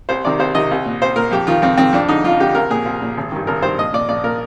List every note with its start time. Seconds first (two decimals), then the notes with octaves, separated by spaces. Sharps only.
0.09 C2 C5
0.25 C3 D#3 D5
0.39 C2 C5
0.55 C3 D#3 D#5
0.71 C2
0.86 A#2
1.02 C2 C5
1.16 A#2 A#4
1.31 F2 G4
1.47 D#3 F4
1.62 F2 C4
1.78 D#3 C4
1.93 F2 D4
2.08 D3 D#4
2.24 F2 F4
2.40 D3 G4
2.55 C2 A#4
2.70 A#2 G#4
2.85 C2
3.02 A#2
3.17 G#1
3.32 G2 D#3
3.47 G#1 A#4
3.62 G2 D#3 C5
3.78 A#1 D#5
3.93 A#2 D5
4.09 A#1 D5
4.24 A#2 A#4